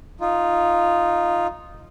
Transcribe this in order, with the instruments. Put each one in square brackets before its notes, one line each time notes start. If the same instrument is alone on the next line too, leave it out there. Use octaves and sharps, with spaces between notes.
[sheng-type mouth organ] D#4 F4